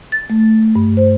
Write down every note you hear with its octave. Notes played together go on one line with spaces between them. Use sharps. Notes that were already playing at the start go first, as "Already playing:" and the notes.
A6
A3
G2
C5